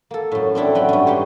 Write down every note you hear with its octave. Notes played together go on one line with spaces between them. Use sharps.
A#3 A4
F#2 A2
C4 D4 E4 A4
F#3 B4 G5 B5
G2 C#4
D#4 G4 C5 C#5